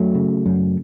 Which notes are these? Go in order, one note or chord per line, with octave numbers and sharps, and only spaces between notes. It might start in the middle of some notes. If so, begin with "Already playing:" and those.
Already playing: F#2 F#3 A3
C#3
F#2